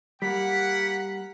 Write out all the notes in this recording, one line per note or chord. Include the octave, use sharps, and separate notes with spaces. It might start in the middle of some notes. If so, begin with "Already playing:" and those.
G3 A#3 F#5 B6